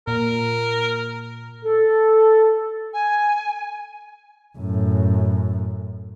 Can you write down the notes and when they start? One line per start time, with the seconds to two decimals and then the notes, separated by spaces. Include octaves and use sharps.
0.07 A#2 A#4
1.64 A4
2.94 G#5
4.58 F#2 A2